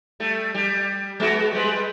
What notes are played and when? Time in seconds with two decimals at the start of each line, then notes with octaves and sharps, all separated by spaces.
0.20 G3 A3
0.55 G3
1.20 G#3 B3 F#4
1.53 G3 G#3 B4